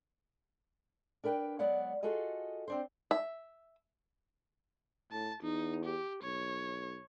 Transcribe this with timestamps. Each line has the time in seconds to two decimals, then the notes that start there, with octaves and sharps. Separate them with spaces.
1.24 D4 A#4 B4 G5
1.59 F#3 G#3 B3 D5 F#5
2.03 F4 F#4 G#4 A4 D#5
2.68 C4 D4 C5
3.11 E5
5.12 A2 A5
5.43 E2 D#4
5.85 G4
6.23 B1 C#5